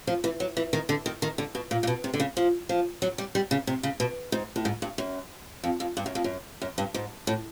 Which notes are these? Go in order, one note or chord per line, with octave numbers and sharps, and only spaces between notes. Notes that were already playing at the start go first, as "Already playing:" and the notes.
F3
E3
F#3
E3
D#3
D3
D#3
D#3
D3
B2
A#2
A#2
B2
C3
D3
C#3
F3
F3
F#3
G3
G3
C#3
C3
C#3
B2
G#2
A2
G#2
G2
F#2
F2
F2
G2
F#2
F2
F#2
F#2
G2
G#2
A2